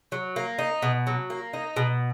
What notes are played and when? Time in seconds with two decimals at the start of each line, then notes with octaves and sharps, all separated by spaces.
0.12 F#3
0.36 A#3
0.59 D#4
0.82 B2
1.07 F#3
1.30 A#3
1.53 D#4
1.76 B2